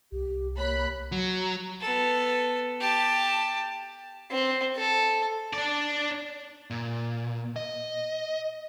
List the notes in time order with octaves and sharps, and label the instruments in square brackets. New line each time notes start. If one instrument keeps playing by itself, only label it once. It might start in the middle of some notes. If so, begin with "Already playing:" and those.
[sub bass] C2 [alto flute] G4
[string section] A#3 B5 F#6 [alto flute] C#5
[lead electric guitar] F#3
[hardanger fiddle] B3 A4
G4 A5
C4
A4
[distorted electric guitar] D4 D5
[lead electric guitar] A#2
D#5